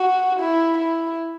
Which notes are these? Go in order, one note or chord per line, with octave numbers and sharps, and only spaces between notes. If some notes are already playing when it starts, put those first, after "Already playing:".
Already playing: F#4
E4
E4